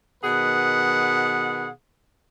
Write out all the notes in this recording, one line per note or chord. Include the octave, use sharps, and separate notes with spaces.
B2 D#3 G#4 B4 F#5